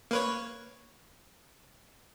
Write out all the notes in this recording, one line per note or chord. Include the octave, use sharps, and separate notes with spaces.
A#3 B4 C#5